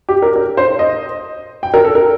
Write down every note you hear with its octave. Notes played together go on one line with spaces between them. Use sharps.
G4
A#4
A#4
C5
D#5
G5
A#4
A4
A#4